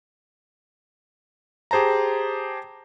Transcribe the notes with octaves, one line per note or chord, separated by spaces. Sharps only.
G4 G#4 C5 A5 A#5